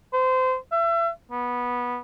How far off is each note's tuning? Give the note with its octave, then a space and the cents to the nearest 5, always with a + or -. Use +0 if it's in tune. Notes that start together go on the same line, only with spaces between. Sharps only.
C5 -25
E5 +35
B3 -15